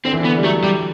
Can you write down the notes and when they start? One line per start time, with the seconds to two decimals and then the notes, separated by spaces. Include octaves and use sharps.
0.05 D3 C4
0.13 E3
0.20 D3 B3
0.37 G3
0.44 F#3 A3
0.64 G3